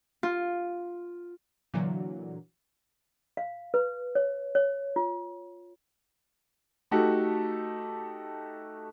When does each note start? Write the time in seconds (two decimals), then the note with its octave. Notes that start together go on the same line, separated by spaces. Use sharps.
0.23 F4
1.74 A#2 D3 E3 F#3
3.37 F5
3.74 B4
4.15 C#5
4.55 C#5
4.96 F4
6.91 A3 D#4 F#4 G4 A4